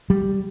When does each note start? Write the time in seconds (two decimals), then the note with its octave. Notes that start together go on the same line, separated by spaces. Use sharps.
0.10 G3